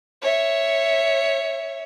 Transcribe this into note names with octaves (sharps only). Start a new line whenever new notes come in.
C#5 E5